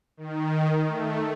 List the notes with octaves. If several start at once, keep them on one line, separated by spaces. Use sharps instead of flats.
D#3
A3